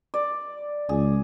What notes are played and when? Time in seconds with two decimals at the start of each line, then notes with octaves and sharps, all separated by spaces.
0.14 D5
0.89 C#2 G#4